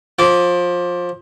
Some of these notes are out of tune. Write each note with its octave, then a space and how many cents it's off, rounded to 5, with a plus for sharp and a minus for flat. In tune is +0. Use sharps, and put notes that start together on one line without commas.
F3 +20 D6 -15